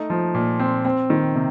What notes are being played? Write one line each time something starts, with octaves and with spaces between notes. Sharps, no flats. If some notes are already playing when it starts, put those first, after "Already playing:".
Already playing: A3 D#4
F3
A#2
C4
C4
D#3
C3